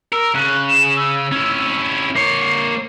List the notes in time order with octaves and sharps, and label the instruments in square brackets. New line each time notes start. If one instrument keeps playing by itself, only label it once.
[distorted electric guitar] A#4 [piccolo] E6
[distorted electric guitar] C#3 [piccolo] F#6
[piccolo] E7
E6
[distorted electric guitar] C#4 E4
[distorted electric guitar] A#3 C#5 [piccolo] C7